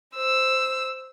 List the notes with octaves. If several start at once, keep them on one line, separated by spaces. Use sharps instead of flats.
C5 E6